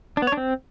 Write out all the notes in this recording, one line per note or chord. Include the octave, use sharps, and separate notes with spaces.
D4
B3
C#5
D4
C4